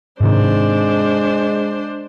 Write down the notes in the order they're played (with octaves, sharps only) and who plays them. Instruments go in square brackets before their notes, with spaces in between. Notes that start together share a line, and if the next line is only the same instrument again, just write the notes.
[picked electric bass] G#2 C3 D#3 [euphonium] G#3 [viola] D4 C5